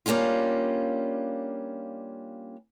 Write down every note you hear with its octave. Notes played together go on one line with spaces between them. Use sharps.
G3 A#3 C#4 D4 F4